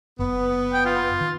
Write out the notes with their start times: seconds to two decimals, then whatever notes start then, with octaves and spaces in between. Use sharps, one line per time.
0.19 F#1 B3
0.73 G5
0.85 F4
1.21 D#3